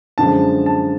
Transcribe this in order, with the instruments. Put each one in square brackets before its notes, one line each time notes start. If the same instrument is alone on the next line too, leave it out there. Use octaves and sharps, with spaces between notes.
[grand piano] F#2 D3 F3 G#3 A5
A5